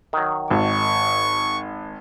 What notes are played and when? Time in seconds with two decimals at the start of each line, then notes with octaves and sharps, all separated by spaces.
0.13 D#3 F#3
0.50 G#1 C#6